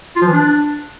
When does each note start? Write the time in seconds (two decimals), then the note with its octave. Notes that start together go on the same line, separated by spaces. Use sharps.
0.16 F4
0.22 F3
0.27 E3
0.33 D4